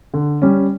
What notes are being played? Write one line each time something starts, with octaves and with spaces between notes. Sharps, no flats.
D3
G3 C#4